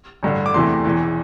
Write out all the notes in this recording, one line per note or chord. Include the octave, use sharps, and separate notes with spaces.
A1 G2 D3
D6
E2 C3 E3 A3 C6
E1 E2 E3